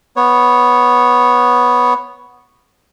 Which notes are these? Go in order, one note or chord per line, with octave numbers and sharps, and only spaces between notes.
B3 C#5